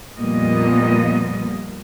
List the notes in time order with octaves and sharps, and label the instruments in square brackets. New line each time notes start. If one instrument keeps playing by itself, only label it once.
[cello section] F2 A#2 G3 A#3 B3 D#5